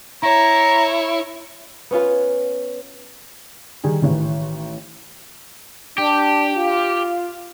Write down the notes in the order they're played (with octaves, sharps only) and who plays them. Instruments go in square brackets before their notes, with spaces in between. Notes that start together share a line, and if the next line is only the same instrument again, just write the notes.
[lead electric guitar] E4 [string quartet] C#5 [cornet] A#5
[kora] B3 C#4 F4 B4
[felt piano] D#3 G3 G#4
A1 D#3 E3
[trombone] D4 [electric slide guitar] G4
[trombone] F4